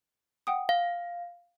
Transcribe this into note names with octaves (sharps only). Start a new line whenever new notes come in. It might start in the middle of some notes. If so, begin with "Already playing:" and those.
F#5 G5 D#6
F5